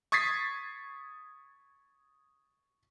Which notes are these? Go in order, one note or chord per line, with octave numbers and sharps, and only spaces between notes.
C#6 D#6 G#6 A6 B6 C7